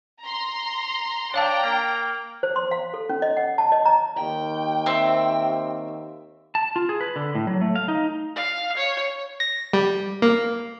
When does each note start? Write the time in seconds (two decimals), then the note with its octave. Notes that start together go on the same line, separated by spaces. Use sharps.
0.22 A#5 C6
1.34 D4 C#5 F5 G5 A5 A#5
1.63 A#3
2.43 C5
2.56 C6
2.71 F5
2.94 A4
3.09 C#4
3.22 D#5
3.37 F#5
3.58 A5
3.72 D#5
3.85 A#5
4.17 D#2 G5
4.86 C4 E5
6.55 A5
6.76 F4
6.89 G#4
7.01 B4
7.16 D3
7.35 A2
7.47 F#3
7.61 A3
7.76 F5
7.88 D#4
8.36 F5
8.77 C#5
9.40 A#6
9.73 G3
10.22 A#3